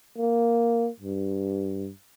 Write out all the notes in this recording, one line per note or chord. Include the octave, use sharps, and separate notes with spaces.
A#3
G2